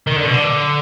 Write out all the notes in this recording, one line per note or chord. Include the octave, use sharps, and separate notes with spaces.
D#3
D3
B2
D3